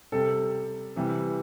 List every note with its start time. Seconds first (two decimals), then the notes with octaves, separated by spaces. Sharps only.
0.12 C3 G3 A4
0.96 C3 E3 G3